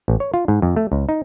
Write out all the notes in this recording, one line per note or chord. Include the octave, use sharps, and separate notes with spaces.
A1
C#5
F4
G#2
F2
A3
C#2
D#4